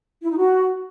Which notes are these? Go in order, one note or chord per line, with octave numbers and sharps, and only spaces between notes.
E4
D#4
F#4